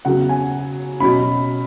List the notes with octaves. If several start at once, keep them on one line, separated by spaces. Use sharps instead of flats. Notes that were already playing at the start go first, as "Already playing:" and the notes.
C#3 F#3 B3 F#5
G#5
B2 F#3 C#4 B5